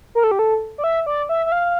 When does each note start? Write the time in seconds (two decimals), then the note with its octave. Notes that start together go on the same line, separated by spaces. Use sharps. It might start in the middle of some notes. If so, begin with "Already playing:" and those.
0.15 A#4
0.24 A4
0.31 G4
0.39 A4
0.78 D5
0.84 E5
1.06 D5
1.29 E5
1.46 E5
1.52 F5